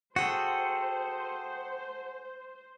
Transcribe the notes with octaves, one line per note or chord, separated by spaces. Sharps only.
F#4 G#4 A4 C5 F#5 G5